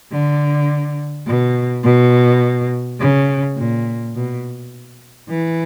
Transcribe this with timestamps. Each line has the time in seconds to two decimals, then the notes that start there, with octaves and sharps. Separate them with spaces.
0.12 D3
1.27 B2
1.84 B2
3.00 C#3
3.57 A#2
4.15 B2
5.30 E3